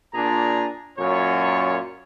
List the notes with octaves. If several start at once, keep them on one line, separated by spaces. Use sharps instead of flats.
A#2 D4 G#4 A#5
F#2 A#2 C#5